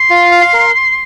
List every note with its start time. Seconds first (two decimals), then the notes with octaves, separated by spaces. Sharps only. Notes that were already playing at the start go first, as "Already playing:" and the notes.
Already playing: C6
0.10 F4
0.32 F5
0.53 A#4